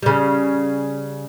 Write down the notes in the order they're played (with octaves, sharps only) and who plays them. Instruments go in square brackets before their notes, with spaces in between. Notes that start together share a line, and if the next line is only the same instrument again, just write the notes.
[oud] C#3 G3